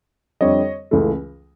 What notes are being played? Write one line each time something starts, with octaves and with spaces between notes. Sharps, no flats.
F2 D3 G3 C4 C#5 D#5
C#2 C#3 E3 A3